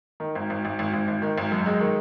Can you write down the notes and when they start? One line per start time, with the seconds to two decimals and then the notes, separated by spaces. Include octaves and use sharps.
0.20 D#3
0.35 G#1
0.50 G#1
0.65 G#1
0.79 G#1
0.94 G#1
1.08 G#1
1.22 D#3
1.38 G#1
1.52 F#2
1.66 G#3
1.81 D#3